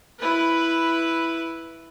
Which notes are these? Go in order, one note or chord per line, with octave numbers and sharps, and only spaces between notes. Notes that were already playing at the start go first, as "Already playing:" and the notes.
E4 B4